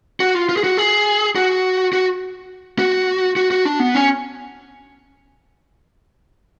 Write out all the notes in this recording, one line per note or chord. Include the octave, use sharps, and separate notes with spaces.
F#4
F4
F4
G#4
F#4
G#4
F#4
F#4
F#4
F#4
F#4
D4
B3
C#4